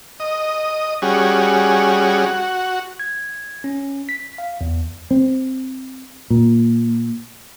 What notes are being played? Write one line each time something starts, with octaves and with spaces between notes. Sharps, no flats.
D#5
G3 C#4 F#4 G#4
F#4
G#6
C#4
B6
F5
E2
C4
A#2